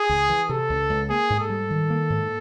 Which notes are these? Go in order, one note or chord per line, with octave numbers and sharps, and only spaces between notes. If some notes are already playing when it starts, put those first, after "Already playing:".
Already playing: G#4
C#2
E3
C3 A4
C#2
C#2
A#3 G#4
G#2
A4
G3
D#3
A#3
G#2